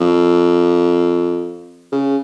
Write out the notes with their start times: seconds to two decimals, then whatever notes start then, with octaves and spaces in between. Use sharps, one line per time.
0.01 F2
1.92 C#3